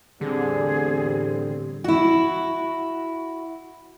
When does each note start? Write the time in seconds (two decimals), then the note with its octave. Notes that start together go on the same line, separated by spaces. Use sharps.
0.21 E2 A2 D3 G3 C4 G#4
1.84 E4 F#4